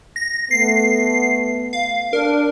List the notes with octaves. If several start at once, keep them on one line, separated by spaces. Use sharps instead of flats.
A#6
A3 B3 C7
F5
D4 A#4